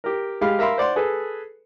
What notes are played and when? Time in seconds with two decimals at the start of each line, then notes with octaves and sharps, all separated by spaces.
0.04 G4 A#4
0.41 G#3 G4 F5 B5
0.59 A#4 E5 F5 B5 C6
0.78 C5 D5 F#5 C6
0.96 G#4 A4 B4